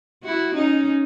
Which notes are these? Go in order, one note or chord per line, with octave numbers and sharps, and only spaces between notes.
E4 F#4
C#4 D#4